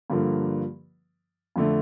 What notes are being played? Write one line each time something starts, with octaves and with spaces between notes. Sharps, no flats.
G2 D3 F3 A#3
F2 D3 A3